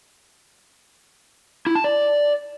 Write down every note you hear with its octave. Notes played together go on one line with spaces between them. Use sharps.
E4
A5
D5